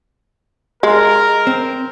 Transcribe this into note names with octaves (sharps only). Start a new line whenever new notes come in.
G#3 A#4
C4